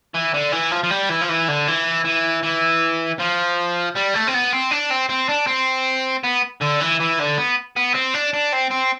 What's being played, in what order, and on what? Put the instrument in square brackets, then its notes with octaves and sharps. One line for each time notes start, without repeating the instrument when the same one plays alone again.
[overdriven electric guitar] E3
D3
E3
F3
F3
G3
E3
F3
E3
D3
E3
E3
E3
F3
G3
A3
C4
B3
C4
D4
C4
C4
D4
C4
B3
D3
E3
E3
D3
B3
B3
C4
D4
D4
C4
C4